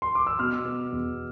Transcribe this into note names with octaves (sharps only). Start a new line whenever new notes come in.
C6
D6
E6
B2 F6
B3
E2